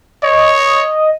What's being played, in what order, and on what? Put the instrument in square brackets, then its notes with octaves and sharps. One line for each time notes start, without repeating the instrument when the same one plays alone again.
[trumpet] C#5 [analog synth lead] D#5